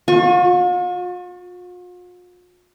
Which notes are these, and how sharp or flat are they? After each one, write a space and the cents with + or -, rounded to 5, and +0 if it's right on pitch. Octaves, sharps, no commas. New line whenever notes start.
F4 +45 C#6 -5